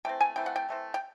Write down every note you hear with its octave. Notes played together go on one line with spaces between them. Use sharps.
E3 A3 C4 G5
G#5
E3 A3 C4 G5
F#5
G5
E3 A3 C4
G5